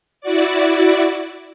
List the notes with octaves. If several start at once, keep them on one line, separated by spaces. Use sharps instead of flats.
E4 F#4 D5